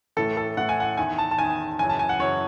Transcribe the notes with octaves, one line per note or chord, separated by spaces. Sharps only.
A2 E3 A4
A4
A2 E3 F#5
G#5
F#5
E2 D#3 G#5
A5
A5
E2 D#3 G#5
F#2 C#3 E3 G#5
A5
G#5
F#5
F#2 C#3 E3 C#5